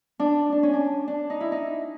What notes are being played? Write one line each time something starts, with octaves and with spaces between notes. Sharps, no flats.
D4
D4
C#4
D4
D4
D#4
E4
D#4